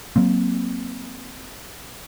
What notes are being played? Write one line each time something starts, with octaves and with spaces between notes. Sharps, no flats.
F#3 A#3 C4